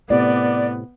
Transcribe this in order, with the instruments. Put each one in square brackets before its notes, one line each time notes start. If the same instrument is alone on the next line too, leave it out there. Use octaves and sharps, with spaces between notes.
[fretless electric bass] A2 C3 [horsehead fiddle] B3 [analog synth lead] D5